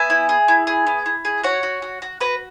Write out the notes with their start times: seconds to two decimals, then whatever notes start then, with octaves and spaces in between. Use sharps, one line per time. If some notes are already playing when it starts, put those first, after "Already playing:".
Already playing: B3 E5 G#5
0.10 E4
0.29 G#4
0.48 E4
0.67 G#4
0.87 B3
1.06 E4
1.25 G#4
1.44 F#4 C#5 F#5
1.63 F#4
1.82 F#4
2.02 F#4
2.21 F#4 B4